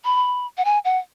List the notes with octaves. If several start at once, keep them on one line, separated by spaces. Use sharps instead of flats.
B5
F#5
G#5
F#5